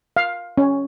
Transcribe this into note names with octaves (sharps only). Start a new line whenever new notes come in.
F5
C#4